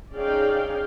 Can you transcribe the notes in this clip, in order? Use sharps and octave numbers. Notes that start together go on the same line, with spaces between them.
C#4 D#4 G#4 D5 F5 G5